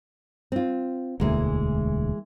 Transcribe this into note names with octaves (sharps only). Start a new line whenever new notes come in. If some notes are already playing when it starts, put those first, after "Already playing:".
C4 F4
E1 D2 E3 G#3 A#3